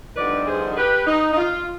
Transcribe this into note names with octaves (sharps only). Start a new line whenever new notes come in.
G2 D3 F3 B3 D#4 B4 D5
G#4 C5
G#4
G4 B4
D#4
D#4
F4